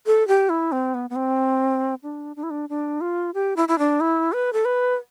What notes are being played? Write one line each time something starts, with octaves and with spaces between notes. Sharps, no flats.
A4
G4
E4
C4
B3
B3
C4
D4
D4
E4
D4
D4
F4
G4
E4
E4
D4
E4
B4
A4
B4